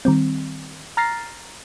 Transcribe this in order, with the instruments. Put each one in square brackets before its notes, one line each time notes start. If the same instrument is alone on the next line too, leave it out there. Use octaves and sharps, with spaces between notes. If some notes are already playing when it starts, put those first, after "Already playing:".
[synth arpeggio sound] D#3 G3 C4
A#5 F6 A6 A#6 C7